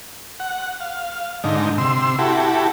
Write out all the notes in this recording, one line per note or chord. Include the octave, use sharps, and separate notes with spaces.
F#5
F5
G#2 D3 D#4
C3 C6 E6
E4 F#4 G4 A4